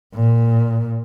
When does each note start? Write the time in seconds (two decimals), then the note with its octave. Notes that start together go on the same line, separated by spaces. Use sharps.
0.14 A#2